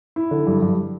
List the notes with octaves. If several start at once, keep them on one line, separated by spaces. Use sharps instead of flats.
E4
D3
G2
G2